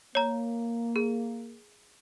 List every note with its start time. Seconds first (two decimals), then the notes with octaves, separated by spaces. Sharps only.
0.15 A#3 C#5 A#5
0.96 G#4